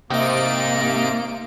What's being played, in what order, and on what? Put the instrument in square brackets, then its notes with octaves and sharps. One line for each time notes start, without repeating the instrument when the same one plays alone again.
[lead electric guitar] G#2 D#4 [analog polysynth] C3 D7 [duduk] A#3